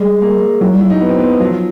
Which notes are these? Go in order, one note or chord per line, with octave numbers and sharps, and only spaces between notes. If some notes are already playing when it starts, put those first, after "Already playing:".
Already playing: G3 G#3
A#3
F#3 E4
G3
E4
F#3
D#4
B3
C4
B3
F3 F#3